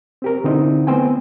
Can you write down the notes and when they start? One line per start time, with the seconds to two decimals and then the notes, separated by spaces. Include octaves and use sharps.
0.22 C4 G4 A#4
0.44 D3 C4 D#4 E4
0.87 A3 B3 C4 C5 G5 G#5